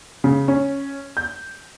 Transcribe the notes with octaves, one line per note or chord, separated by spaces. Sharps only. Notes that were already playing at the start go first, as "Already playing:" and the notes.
C#3
C#4
G6